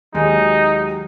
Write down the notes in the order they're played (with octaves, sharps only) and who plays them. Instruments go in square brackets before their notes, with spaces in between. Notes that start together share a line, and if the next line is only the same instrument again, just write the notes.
[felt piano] D#2 G#3 D#5 [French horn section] F#3 G4 [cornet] D#4